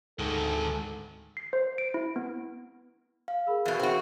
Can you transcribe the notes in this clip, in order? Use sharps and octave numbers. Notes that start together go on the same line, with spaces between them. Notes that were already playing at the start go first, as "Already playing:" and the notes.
D2 G#2 D#3 A4
C7
C5
D7
E4
B3
F5
G#4 A#4 B5 E6
E2 B2
C4 F#4 A#4 E5